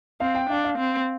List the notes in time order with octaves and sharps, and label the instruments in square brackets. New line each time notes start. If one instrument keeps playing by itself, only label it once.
[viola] C4 [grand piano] F5
[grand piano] G5
[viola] D4 [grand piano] F5
[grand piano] F5
[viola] C4